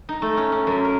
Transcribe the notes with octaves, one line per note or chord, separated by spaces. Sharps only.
D#4
A3
C#4
C#4
F#2
A#4